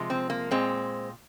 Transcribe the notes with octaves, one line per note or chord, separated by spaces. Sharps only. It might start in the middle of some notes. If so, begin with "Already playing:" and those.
Already playing: C3 F3 G#3
C4
A#3
A#2 G#3 C4